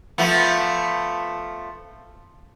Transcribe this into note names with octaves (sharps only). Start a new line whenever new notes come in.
F3 A3 B3